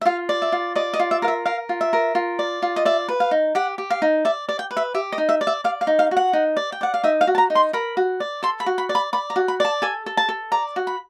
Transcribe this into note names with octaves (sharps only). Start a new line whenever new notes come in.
E5
F4 F5
D5
E5
F4
D5 D#5
D#5
F4
E5
A#4 F5
E5
A#4 F5
F4
E5
A#4
F4
D5
F4
D#5
D5 E5
B4
F5
D#4
G4 F#5
G4
F5
D#4
D5 E5
D5
G5
B4
E5
G4 E5
D#5
D#4
E5
D5
E5
D5 F5
F5
D#4
F5
F#4
F#5
D#4
D5
G5
D5 F#5
F5
D#4 E5
F5
F#4
A5
A#5
D#4
C6
A#4 B5
F#4
D5
A4 C6
B5
F#4
B5
D5
B5
D5 B5
A#5
F#4
B5
D5 A5
A4 G#5
A4
A5
A4
D5 A#5
F#4
B5